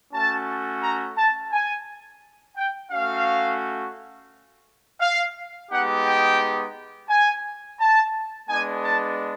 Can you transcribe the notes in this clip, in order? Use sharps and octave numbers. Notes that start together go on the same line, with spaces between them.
A3 C#4 F#4 A5
A#5
A5
G#5
G5
A3 C#4 F#4 F5
F5
G#3 B3 D#4 G4 F#5
G5
G#5
A5
G#3 B3 D4 G#5
A5